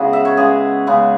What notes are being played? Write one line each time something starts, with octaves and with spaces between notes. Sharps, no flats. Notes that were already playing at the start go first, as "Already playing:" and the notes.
Already playing: C#3 G#3 B3 E4 F#4 G#4
E5
C#5
C#3 G#3 B3 G#4
C#3 G#3 B3